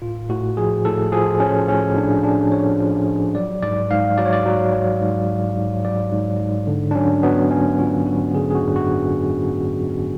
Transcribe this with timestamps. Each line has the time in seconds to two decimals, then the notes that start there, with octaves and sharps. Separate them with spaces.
0.02 A2 F4
0.30 A2 F#4
0.57 F3 G#4
0.85 A2 A4
1.12 F3 G#4
1.40 F3 C#4
1.68 A2 C#4
1.96 A2 D4
2.24 A2 D4
2.52 F3 C#5
2.79 F3
3.07 F3
3.35 F#3 D5
3.62 G#2 D5
3.90 G#2 F5
4.18 F#3 D5
4.25 C#5
4.33 D5
4.46 F#3
4.73 F#3
5.01 G#2
5.29 F#3
5.57 G#2
5.85 F#3 D5
6.12 G#2
6.40 G#2
6.67 D3
6.91 D4
6.96 F#3 C#4
7.23 F#3 B3
7.51 F#3 C#4
7.79 F#3 F4
8.06 D3 F#4
8.34 D3 G#4
8.51 G#4
8.55 F#4
8.62 F#2
8.76 F#4